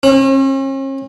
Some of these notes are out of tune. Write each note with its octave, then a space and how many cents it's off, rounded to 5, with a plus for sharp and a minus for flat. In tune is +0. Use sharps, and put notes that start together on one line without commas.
C#4 -45